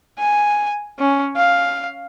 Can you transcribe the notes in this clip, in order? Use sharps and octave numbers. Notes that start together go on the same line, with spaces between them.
G#5
C#4
F5